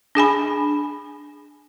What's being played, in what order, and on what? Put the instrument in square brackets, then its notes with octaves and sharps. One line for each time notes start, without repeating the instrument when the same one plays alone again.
[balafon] D4 G#4 G#5 B5